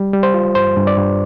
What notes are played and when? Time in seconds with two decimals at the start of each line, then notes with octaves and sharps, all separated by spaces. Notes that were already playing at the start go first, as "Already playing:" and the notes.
Already playing: G3
0.13 G3
0.23 C5
0.34 F4
0.55 G2 C5
0.76 G2
0.87 D5
0.98 G2